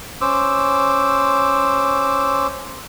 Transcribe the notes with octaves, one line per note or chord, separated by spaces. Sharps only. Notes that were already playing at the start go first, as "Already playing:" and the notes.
C#4 C5 D6 E6